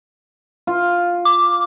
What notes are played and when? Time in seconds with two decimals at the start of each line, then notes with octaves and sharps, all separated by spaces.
0.67 F4
1.25 D6